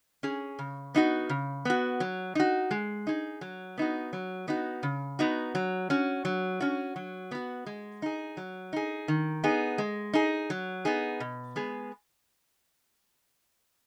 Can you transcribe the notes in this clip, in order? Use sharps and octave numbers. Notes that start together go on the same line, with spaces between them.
C#4 G#4
C#3
B3 D#4 F#4
C#3
B3 F#4
F#3
D#4 F#4
G#3
D#4 G#4
F#3
B3 D#4 F#4
F#3
B3 D#4 F#4
C#3
B3 D#4 F#4
F#3
C#4 F#4
F#3
C#4 F#4
F#3
B3 F#4
G#3
D#4 G#4
F#3
D#4 G#4
D#3
B3 D#4 G#4
G#3
D#4 G#4
F#3
B3 D#4 G#4
B2
G#3 B3 G#4